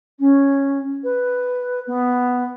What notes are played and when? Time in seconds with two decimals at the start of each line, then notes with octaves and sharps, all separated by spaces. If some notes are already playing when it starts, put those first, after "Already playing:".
0.19 C#4
1.03 B4
1.87 B3